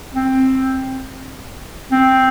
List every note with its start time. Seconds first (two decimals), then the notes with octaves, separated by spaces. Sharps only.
0.15 C4
1.92 C4